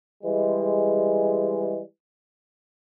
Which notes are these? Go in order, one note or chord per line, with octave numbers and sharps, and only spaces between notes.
E3 G3 G#3